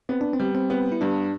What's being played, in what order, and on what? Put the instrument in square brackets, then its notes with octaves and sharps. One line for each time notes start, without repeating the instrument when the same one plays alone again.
[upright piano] B3 [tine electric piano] C4
[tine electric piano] D4
C4
[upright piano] G3
[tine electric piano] C4
[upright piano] B3
[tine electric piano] E4
[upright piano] G2 [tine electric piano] D4